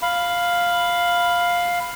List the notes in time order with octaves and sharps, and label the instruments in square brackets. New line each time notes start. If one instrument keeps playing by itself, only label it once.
[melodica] F5 B5